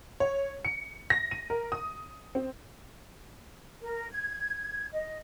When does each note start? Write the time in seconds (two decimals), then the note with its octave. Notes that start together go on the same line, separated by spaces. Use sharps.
0.20 C#5
0.65 C#7
1.10 A#6
1.31 D#7
1.50 A#4
1.72 D#6
2.35 C4
3.81 A#4
4.10 G#6
4.92 D#5